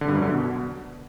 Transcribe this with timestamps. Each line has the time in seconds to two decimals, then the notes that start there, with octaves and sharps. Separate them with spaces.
0.01 D3
0.08 G2
0.15 F#2
0.22 D3
0.29 B2